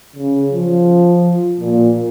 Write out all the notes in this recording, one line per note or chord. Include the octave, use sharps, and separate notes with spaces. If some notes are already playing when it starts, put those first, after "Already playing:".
C#3
F3
A#2